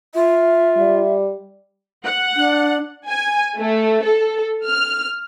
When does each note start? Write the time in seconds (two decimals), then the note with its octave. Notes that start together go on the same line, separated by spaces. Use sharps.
0.15 F4 E5
0.77 G3
2.04 F#5
2.36 D4
3.08 G#5
3.59 A3
4.03 A4
4.65 F6